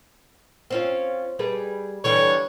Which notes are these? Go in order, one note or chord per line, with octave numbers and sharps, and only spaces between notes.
C4 C#4 F4
G3 G#4 B4
D3 E3 G3 C#5